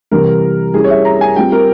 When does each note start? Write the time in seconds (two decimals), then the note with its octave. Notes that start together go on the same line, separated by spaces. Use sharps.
0.11 C3 E3 G3 A#4
0.74 G3 C#4 E4 G#4
0.84 C#5
0.90 E5
1.05 A#5
1.21 G#5
1.36 G3 C4 F4 G5
1.52 A#4